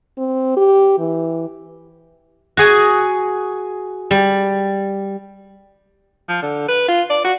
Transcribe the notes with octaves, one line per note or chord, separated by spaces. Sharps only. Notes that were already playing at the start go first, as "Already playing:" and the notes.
C4
G4
E3
F#4 G#4 G#5
G3
F3
D3
B4
F4
D5
F#4